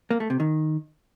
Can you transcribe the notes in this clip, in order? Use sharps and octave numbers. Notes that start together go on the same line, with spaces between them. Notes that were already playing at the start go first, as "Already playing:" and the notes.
A#3
A3
C3
D#3